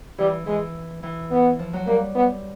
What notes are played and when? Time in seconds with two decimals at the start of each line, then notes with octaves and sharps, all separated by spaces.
0.18 E3 G3
0.46 E3 G#3
1.03 E3
1.31 B3
1.59 F3
1.73 F#3
1.87 G3 A#3
2.15 B3